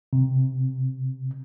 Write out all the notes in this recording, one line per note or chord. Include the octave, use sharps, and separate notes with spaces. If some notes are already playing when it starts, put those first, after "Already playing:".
C3